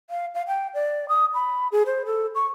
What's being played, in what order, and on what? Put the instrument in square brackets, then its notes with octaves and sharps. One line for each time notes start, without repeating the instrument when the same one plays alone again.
[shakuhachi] F5
F5
G5
D5
D#6
B5
G#4
C5
A4
C#6